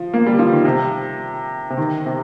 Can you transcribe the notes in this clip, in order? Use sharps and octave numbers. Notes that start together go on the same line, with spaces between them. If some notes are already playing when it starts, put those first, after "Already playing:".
Already playing: F3
A#3
G3
F3
D#3
C3
C3
D#3
C3